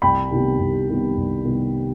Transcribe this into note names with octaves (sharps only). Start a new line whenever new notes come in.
C2 G5 B5
C3 D#3 G3 B3
C2
C3 D#3 G3 B3
C2
C3 D#3 G3 B3